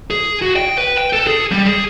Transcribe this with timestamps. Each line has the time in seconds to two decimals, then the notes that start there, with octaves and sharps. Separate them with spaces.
0.11 G#4
0.42 F#4
0.56 G5
0.78 B4
0.98 G5
1.13 A4
1.27 G#4
1.52 G3
1.66 G#4